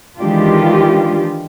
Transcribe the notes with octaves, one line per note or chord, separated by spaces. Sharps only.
D#3 E3 G#3 D4 F4 G4